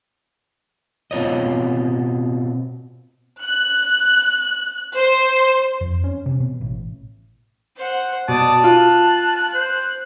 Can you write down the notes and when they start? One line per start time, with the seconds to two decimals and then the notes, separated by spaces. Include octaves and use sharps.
1.11 B2 C4 F4 C#5 D#5
3.43 F#6
4.96 C5
5.81 F2
6.04 C#4
6.26 C3
6.40 B2
6.61 A1
7.76 C5 F#5
8.28 B2 D5 A5 D#6
8.64 F4 F#6
9.55 C5